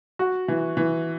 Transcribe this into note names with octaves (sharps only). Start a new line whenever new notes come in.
F#4
E3
E3